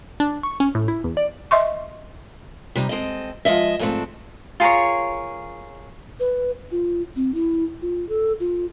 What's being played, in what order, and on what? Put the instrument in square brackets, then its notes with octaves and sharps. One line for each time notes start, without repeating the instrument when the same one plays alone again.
[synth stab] D4
C#6
C#4
A2
E4
E2
D5
[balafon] D#5 E5 C6 C#6
[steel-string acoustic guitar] C3 G3 D#4
G#3 C4 A4 D#5
F3 G#3 D#5 E5
G#2 F3 A3 B3 C4 D4
[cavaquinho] F4 G#4 A#4 C#5
[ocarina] B4
F4
C4
E4
F4
A4
F4